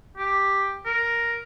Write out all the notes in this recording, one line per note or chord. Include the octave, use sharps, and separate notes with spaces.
G4
A#4